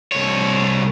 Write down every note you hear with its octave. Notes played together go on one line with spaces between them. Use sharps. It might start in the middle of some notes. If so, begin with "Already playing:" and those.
C2 C#5